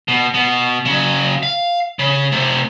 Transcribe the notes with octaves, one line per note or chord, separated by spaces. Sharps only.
B2
B2
C#3 F#3
F5
C#3
C3 A3